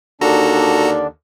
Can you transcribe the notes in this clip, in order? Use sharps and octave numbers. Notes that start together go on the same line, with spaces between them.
D#2 D3 D4 F#4 A4 A#5